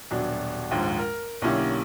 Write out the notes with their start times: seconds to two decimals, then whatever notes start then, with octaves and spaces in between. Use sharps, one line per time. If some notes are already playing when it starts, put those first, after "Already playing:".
0.11 D#1 B2 F#3 D4
0.71 A#1 D#2 G#2 F3 G#3
0.99 A#4
1.42 B1 D3 A#3 C#4 E4 G4